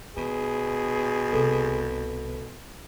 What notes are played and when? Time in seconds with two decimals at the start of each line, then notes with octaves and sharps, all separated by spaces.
0.17 B2 D#3 G#4
1.33 C2 C3 A4